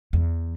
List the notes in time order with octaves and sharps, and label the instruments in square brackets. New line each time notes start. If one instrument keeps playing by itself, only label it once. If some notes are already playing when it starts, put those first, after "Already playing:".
[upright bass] E2